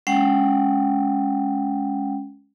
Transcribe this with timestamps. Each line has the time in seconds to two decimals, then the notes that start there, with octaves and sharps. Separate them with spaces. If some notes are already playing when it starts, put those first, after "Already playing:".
0.07 G#3 C#4 F#5 G5